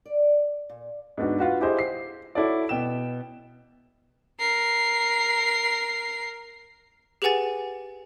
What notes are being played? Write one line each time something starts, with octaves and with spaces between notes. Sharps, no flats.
D5
A#2
G#2 B3 D4 F#4
F4 F#4 B4
E4 G4 G#4 C5 D#5
C7
E4 F#4 A4 C#5 D5
B2 G5 E7
A#4 C7
G4 G#4 B4 F#5 G#5 A6